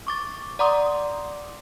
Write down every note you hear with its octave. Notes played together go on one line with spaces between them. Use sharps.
C#6 D6 A6
D5 F#5 A#5 C6 D6 D#6